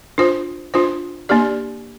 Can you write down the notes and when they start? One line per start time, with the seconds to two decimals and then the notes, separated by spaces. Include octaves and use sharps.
0.18 D4 F4 C5
0.74 D4 F4 C5
1.29 A#3 D4 G4 D5